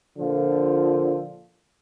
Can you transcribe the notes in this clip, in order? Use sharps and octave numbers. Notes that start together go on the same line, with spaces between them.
A#2 D3 F3 F4